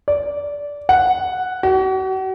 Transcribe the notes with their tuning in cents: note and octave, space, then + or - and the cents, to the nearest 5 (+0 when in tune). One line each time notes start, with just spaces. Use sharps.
D5 -15
F#5 -5
F#4 +40